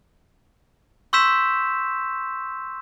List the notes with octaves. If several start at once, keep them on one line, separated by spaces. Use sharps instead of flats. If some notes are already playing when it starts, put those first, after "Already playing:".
C6 C#6 E6 G6 B6 E7